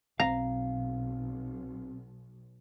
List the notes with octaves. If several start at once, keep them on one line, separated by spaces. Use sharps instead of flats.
B1 C4 F5 A#5